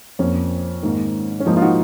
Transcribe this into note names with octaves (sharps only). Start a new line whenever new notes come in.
F2 F3 A#3 C#4
G#2 D#3 A#3
C#4
G#2 F3 A#3 D#4
F4
D#4 F#4